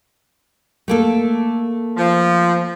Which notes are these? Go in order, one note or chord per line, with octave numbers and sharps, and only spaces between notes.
A3 A#3 A4
F3